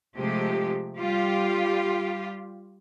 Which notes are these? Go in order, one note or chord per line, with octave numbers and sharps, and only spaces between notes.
C3 F3 G#3 A3 G4
G3 F4 G4